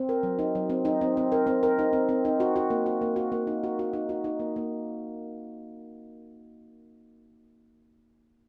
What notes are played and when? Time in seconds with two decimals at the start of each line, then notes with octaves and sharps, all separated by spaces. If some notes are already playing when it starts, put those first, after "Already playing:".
Already playing: C4
0.09 A#4
0.23 F#3
0.39 D#4
0.55 F#3
0.70 C4
0.85 D#4
1.01 C4
1.17 C4
1.32 A#4
1.47 C4
1.63 A#4
1.79 D#4
1.93 C4
2.09 C4
2.25 D#4
2.40 F#4
2.56 F#4
2.70 A#3
2.86 F#4
3.01 A#3
3.16 F#4
3.32 A#3
3.47 D#4
3.64 F#4
3.79 F#4
3.93 D#4
4.09 F#4
4.24 D#4
4.40 A#3
4.56 A#3